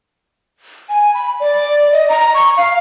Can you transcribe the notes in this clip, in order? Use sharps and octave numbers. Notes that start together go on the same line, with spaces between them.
G#5
B5
D5
D#5
A#5
C#6
F5